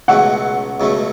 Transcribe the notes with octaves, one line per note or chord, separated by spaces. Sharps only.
C#2 B2 F#3 A3 F#5
C#2 B2 F#3 A3